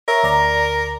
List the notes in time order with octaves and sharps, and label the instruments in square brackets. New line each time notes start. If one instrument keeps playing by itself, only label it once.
[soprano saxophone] A#4 [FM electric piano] C#5 E5
[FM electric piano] D2 D5 A#5